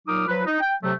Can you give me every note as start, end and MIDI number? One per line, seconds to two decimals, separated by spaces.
0.08 0.26 46
0.08 0.26 54
0.08 0.26 63
0.08 0.26 86
0.08 0.26 87
0.08 0.26 89
0.28 0.42 53
0.28 0.42 54
0.28 0.42 65
0.28 0.42 71
0.46 0.60 63
0.61 0.74 79
0.83 0.93 48
0.83 0.93 54
0.83 0.93 57